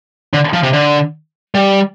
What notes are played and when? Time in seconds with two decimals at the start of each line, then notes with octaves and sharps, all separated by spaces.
0.34 D3
0.53 F3
0.63 C3
0.73 D3
1.55 G3